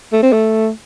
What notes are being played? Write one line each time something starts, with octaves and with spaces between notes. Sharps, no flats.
A3
C4
A3